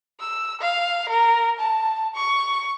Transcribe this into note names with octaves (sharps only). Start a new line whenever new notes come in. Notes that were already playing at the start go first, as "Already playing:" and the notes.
E6
F5
A#4
A5
C#6